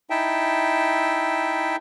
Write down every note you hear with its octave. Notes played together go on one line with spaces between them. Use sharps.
D#4 E4 E5 G5 A5